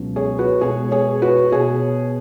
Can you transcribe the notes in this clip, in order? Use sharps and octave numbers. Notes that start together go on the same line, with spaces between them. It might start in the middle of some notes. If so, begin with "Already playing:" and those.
Already playing: C#2 B2 F#3 C#4
G#4 C#5
F#4 B4
B2 G#3 B3 G#4 C#5
G#4 C#5
F#4 B4
B2 B3 G#4 C#5